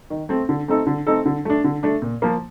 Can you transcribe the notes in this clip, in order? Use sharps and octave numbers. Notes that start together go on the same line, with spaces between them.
D#3
A3 C4
D3
A3 C4 D#4 A4
D3
A3 C4 D#4 A4
D3
A3 D4
D3
A3 D4
A#2
F3 A#3